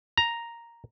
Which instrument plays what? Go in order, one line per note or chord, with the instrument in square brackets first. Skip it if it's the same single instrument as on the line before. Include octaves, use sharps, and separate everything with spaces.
[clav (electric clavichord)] A#5